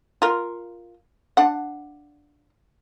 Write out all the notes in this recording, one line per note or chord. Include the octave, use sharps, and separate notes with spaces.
F4 A#4
D4 F#5